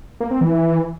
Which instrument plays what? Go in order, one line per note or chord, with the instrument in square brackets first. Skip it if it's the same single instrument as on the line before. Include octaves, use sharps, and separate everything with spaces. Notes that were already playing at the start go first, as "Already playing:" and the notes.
[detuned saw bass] A#3
C4
E3